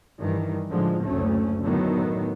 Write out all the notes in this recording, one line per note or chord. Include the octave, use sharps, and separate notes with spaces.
G2 D#3 E3
A2 D3 F3 G#3
F#1 D2 A3 C#4
A2 D3 D#3 F#3 B3